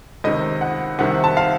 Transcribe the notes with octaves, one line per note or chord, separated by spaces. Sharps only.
C#2 C3 D#3 D#5
F#5
C2 C3 D#3 F#5
A5
F5